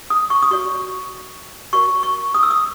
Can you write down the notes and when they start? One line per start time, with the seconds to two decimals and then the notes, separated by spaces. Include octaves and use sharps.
0.10 D#6
0.30 C#6
0.43 D#6
0.51 F#4 C#5 C#6
1.73 F#4 A#4 C#5 C#6
2.03 C#6
2.35 D#6
2.43 E6
2.51 D#6